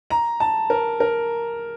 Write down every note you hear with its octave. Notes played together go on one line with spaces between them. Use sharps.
A#5
A5
A#4
A#4